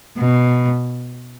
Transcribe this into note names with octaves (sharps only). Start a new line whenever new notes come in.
B2